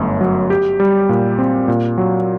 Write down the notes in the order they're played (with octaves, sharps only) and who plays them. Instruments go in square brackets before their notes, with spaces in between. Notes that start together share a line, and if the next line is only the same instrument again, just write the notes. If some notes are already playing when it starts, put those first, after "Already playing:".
Already playing: [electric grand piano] G1 F#2 A3
F#3
G4
G3
A#2
C4
A#2
F#3